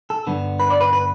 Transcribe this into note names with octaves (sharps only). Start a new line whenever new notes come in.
A4
G2 D3 B3
B4
D5
B4
B4